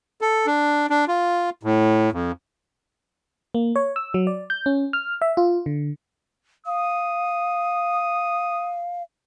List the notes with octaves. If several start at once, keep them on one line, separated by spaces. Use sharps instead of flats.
A4
D4
D4
F4
A2
F2
A#3
C#5
E6
F#3
D5
G6
C#4
F6
E5
F4
D3
F5 D#6